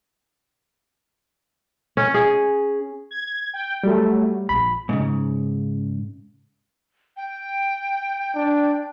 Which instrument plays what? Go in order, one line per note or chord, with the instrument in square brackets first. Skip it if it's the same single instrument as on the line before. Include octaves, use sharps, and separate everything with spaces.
[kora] C#4
G#4
[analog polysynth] G#6
G5
[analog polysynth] F#3 A3 [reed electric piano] G3
[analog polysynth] A#1 [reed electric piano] B5
[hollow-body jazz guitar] G#2 C#3
[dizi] G5
[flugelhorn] D4